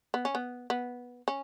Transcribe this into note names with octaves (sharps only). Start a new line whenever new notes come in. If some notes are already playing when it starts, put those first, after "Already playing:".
B3
C#4
B3
B3
C#4